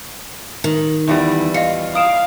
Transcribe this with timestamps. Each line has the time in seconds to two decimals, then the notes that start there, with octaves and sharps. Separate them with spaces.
0.64 D#3
1.07 E2 E3 G3
1.54 F4 D#5 F5 C#7
1.95 F5 D#6 D7 E7